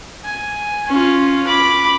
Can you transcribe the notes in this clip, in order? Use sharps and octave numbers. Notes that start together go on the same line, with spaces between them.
G#5
C#4 F4
B5 D6